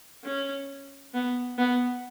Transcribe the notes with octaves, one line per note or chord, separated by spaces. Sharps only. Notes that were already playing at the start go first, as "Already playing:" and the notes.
C#4
B3
B3